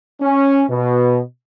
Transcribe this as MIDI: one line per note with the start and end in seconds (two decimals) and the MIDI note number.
0.21 0.63 61
0.69 1.19 47